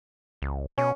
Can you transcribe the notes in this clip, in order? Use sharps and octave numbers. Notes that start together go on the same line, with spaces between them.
C#2
B2 C#4